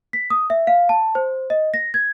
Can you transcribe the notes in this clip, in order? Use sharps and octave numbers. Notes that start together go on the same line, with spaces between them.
B6
D#6
E5
F5
A5
C5
D#5
A#6
G#6